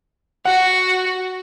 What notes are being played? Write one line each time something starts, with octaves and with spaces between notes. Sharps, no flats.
F#4 F#5